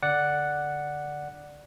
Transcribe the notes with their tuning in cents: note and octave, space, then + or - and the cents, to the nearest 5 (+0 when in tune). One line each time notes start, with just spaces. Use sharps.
D3 +0 D5 +0 F#5 +0